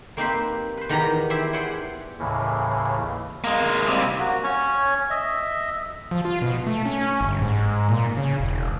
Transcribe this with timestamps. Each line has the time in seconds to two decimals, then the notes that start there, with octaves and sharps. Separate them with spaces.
0.17 A#3 C4 D#4 G4 B4 C5
0.78 B4 C5
0.89 E2 D#3 B3 G4 A#5
1.30 E4 G4 C5 E5
1.53 G#4 B4 C5 D5 F#5 G5
2.19 D#2 A2 C#3 E3
3.44 G#3 A#3
3.88 C3 G3
4.19 A#3 F#4
4.44 C#4 C#5 G#5
5.10 D#5 E5
6.11 F3
6.25 F4
6.42 B2
6.67 A3
6.85 C#4
7.21 G1
7.41 G#2
7.89 A#2
8.17 C#3
8.40 E1